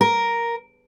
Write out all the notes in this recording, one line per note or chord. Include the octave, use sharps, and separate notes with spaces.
A#4